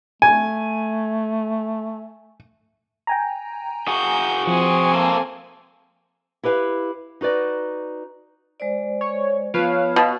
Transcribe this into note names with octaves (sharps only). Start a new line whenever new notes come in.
A3 G#5
G5 G#5 A#5
F#4 G#4 G6
F3 C4 G#5
A#3 A4
E4 G4 B4 E5 F5
D#4 F#4 B4 D5
G#3 C5 D5
C#5
F3 B3 B4 C#5 F5
B2